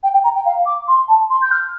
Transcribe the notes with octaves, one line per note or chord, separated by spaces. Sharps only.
G5
G5
A#5
G5
F5
D6
C6
A5
C6
G6
F6